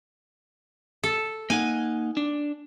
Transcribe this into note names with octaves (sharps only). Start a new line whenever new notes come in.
A4
A#3 D#4 F#5 G#5
D4